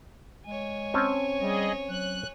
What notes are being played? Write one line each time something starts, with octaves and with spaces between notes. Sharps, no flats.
G#3 C#5 G#5
C4 C#4 A5
G3 G#4 D#5
F#3 F#6